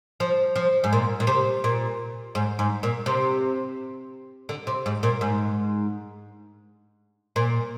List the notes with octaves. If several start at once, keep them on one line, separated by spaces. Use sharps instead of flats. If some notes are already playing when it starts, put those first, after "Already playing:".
F3
F3
G#2
A#2
A#2
C3
A#2
G#2
G#2
A#2
C3
D3
C3
G#2
A#2
G#2
A#2